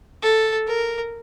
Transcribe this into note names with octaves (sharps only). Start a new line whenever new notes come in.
A4
A#4